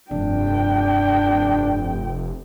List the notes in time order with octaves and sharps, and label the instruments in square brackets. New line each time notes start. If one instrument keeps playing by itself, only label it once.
[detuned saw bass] F1 [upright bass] G2 [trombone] D4 [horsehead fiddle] G5